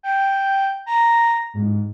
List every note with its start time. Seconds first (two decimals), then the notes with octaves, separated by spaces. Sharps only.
0.03 G5
0.86 A#5
1.54 G#2